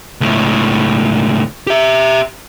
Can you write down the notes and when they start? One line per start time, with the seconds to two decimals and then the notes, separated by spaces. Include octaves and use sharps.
0.21 C#2 A2
1.67 G4 E5